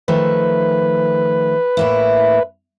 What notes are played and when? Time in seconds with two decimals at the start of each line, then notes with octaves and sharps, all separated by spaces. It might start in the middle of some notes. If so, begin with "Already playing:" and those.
0.08 D#3 F3 A3 B4
1.77 A2 A#3 E4